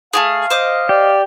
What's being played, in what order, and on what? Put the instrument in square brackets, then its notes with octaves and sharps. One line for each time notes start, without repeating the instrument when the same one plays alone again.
[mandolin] A3 G4 G#4 [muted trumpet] F5
[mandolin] C5 D#5 D6
[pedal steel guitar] G4 [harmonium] D5